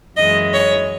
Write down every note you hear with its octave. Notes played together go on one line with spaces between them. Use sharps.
F#2 E3 G#3 D#5
C#5